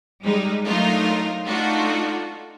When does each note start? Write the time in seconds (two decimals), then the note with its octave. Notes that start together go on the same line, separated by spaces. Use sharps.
0.24 G3 G#3 D#4
0.65 F#3 A3 D4 D#4 F4 A#4
1.45 A3 D4 D#4 F4 F#4 A4